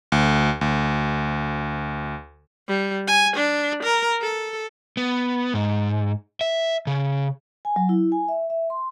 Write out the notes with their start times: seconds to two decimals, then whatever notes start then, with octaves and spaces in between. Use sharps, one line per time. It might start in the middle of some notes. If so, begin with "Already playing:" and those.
0.12 D2
0.61 D2
2.68 G3
3.08 G#5
3.36 D4
3.83 A#4
4.22 A4
4.97 B3
5.54 G#2
6.41 E5
6.87 C#3
7.65 G#5
7.76 F#3
7.89 E4
8.12 G#5
8.28 E5
8.50 E5
8.70 C6